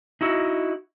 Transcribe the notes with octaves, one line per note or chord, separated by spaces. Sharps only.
D#4 E4 F#4